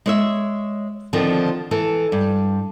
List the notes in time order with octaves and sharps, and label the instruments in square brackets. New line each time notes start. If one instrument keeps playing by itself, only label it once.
[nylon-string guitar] G#3 C#5 E5
D3 D#3 F3 C4
E3 A4
G2